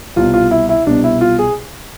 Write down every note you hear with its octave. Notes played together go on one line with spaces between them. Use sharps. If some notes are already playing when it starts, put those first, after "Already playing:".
C2 B2 F4
F4
E4
E4
C2 B2 D4
E4
F4
G#4